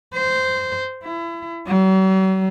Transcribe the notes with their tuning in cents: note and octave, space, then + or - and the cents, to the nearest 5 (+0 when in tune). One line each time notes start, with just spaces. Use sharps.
C5 -15
E4 +30
F#3 +45